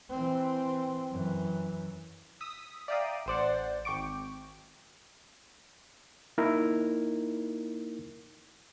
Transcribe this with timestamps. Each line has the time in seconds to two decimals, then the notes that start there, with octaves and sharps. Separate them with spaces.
0.11 E3 C4
1.11 F#2 E3
2.41 D#6 E6 B6
2.88 D5 E5 F5 G5 A#5 D#6
3.26 A1 C5 D5 F#5
3.85 G#1 G5 C#6 D6 D7
6.38 A#3 D#4 E4 A#4